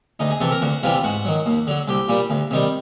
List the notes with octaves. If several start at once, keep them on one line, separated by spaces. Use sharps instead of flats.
D2 D#4
G#4
C3 E3 A4
A#4
D2 F#4
C3 E3 G3 F4
G#2 F#4
D#3 F#3
D#2
D3 F#3
C2 G4
A#2 G3
D2
C3 D#3 G3